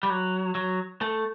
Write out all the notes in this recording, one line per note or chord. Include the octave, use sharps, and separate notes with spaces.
G3
F#3
F#3
A3